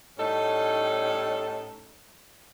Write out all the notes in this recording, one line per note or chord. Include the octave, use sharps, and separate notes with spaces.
A2 G3 C#4 D#4 A4